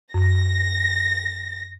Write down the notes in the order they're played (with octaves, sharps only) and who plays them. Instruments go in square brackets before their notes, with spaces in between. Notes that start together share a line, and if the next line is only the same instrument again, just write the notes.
[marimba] F#2 [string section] A#6